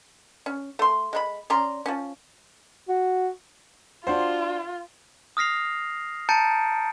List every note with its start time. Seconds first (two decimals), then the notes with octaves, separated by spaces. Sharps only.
0.46 C#4
0.79 A3 C6
1.13 G#3 A3 B5
1.50 C#4 D5 A#5 C6
1.86 F3 C#4
2.88 F#4
4.07 D4 F4 F#4 C5
5.37 D#6 F6 A#6 C7 F7
6.29 A5 A#5 G6 A6 C#7 D7